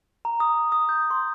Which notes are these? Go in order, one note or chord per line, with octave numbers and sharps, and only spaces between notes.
A#5
D#6
D#6
G6
C6